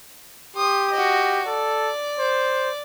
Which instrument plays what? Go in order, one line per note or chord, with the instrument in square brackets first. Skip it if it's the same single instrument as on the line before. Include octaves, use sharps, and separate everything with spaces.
[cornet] G4 [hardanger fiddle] C6 D#6
[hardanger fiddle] F#4 D#5
[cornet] A4 [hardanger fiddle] D5
[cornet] C5